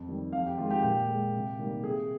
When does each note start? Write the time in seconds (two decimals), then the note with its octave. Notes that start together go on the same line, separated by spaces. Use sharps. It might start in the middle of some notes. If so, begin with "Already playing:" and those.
Already playing: F2
0.08 D#3 G3
0.32 F2 F5
0.46 G4
0.58 D#3 G#3 F4
0.70 G4
0.83 A#2 G4
1.09 G#3
1.34 C3
1.59 D#3 G3 A#3
1.83 C3 G#4